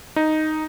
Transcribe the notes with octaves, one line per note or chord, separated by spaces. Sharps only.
D#4